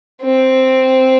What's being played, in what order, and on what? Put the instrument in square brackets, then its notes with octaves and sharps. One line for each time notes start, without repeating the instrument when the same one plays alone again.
[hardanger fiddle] C4